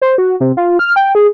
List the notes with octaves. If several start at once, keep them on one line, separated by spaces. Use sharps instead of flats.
C5
F#4
C3
F4
F6
G5
G#4